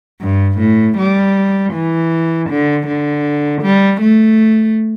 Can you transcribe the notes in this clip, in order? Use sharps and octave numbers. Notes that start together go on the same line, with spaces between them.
G2
A2
G3
E3
D3
D3
G3
A3